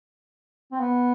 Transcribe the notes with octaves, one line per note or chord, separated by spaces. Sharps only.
C4
B3